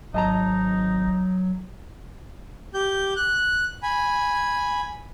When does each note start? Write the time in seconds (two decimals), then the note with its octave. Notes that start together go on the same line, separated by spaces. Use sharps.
0.14 G#1 F#3 D#4 D#5 A5 A#5
2.74 G4 G6
3.16 F#6
3.83 G#5 B5